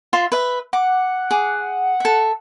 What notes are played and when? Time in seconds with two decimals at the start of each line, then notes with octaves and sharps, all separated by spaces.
0.13 F4 E5 C6
0.32 B4 E5
0.73 F#5 D6
1.31 G#4 D6
2.00 A4 E5